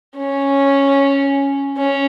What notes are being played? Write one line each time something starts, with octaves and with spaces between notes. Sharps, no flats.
C#4
C#4